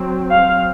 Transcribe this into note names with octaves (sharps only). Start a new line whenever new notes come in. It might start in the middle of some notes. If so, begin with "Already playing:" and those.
Already playing: F#3 C4
F5